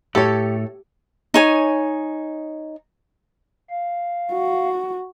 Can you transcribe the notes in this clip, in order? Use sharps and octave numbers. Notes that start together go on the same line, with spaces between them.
A2 G4 A4 C#5
D#4 C#5 G#5
F5
F#4